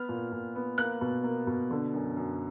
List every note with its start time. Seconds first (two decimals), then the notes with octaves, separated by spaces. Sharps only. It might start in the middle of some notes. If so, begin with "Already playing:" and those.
Already playing: B3 F6
0.09 A#2
0.32 A#2
0.55 B3
0.78 A#3 F#6
1.01 B2
1.24 A#3
1.47 B2
1.71 D3
1.93 F#2
2.16 F#2